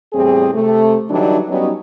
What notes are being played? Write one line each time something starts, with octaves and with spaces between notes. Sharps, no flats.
E2 A2 G3 C4 G#4
C3 A3
D3 E3 F#3 G3 D4 D#4
F#3 G3 B3 C#4 D#4